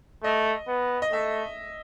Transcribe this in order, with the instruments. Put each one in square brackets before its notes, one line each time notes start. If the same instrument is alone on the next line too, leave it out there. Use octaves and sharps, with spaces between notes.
[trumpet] A3 [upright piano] D#5
[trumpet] B3
[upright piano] D#5
[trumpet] A3 [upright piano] E5